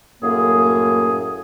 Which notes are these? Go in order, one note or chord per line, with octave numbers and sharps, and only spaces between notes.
F#2 A2 A#3 G#4